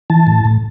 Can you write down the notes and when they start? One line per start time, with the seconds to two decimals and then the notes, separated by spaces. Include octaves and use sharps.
0.10 E3 A5
0.27 A2
0.45 A2